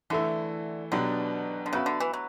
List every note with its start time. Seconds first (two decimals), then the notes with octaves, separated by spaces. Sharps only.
0.10 D3 E3 A3 E4
0.92 B2 D3 F#3 B3 D4 G4
1.66 D3
1.73 C#3 B3 F#4 B4 E5
1.86 D3
2.00 E3
2.13 F#3